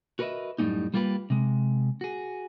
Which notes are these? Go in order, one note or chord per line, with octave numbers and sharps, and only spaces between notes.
F#4 A#4 B4 C#5 D#5 E5
F#2 A2 G3 A#3 C#4 D#4
G3 A#3 F4 G4 B4
C3 G#3
F#4 G#4